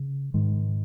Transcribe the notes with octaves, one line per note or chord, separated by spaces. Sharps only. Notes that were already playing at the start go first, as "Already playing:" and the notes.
Already playing: C#3
G#2 D#3 G#3